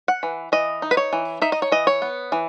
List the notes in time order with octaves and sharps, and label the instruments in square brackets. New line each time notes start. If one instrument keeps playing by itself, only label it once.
[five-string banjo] F#5
E3
E3 D#5
D#4
B4
C#5
E3
D#4 E5
D#5
C#5
E3 D#5
C#5
B3
E3